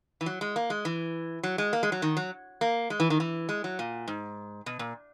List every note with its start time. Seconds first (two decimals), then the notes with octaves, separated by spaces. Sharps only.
0.21 E3
0.26 F#3
0.41 G#3
0.56 A#3
0.70 G#3
0.85 E3
1.43 F#3
1.58 G#3
1.73 A#3
1.83 G#3
1.92 F#3
2.02 D#3
2.17 F#3
2.61 A#3
2.90 G#3
3.00 E3
3.10 D#3
3.20 E3
3.49 G#3
3.64 F#3
3.79 A#2
4.08 G#2
4.66 B2
4.79 A#2